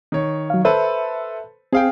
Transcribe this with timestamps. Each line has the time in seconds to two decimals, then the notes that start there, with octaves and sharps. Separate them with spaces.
0.12 D#3 C#5
0.50 F#3 F5
0.65 A4 B4 C5 E5
1.73 C4 G#4 F5 G5